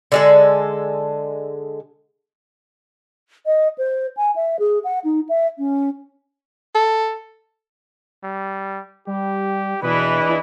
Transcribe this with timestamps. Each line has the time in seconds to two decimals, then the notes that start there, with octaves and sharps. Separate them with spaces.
0.12 D3 G#3 A4
3.46 D#5
3.78 C5
4.17 G#5
4.36 E5
4.59 G#4
4.84 F#5
5.04 D#4
5.29 E5
5.58 C#4
6.75 A4
8.24 G3
9.07 G3 G4
9.83 E2 B2 E3 D4 E4 B4 D#5